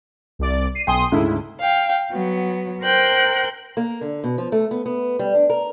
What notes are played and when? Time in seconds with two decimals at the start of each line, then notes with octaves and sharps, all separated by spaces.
0.39 C2 D5
0.75 C7 D#7
0.87 B1 G5 G#5 C6 D#6
1.12 D2 G#2 C#3 E4
1.61 F5 G5
2.11 F#3 B3
2.82 A#4 C5 G5 F#6 G6
3.77 A#3
4.01 D3
4.24 B2
4.38 F3
4.52 A3
4.71 B3
4.86 B3
5.19 G3
5.35 D4
5.50 A#4